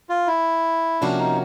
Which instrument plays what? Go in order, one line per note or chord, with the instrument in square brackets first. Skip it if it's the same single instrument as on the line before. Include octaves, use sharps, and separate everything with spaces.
[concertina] F4
E4
[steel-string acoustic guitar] C3 F3 A#3 C#4 F#4 [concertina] D4
[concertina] D#4